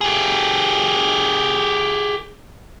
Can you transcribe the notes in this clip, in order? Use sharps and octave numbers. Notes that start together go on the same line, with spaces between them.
G4 G#4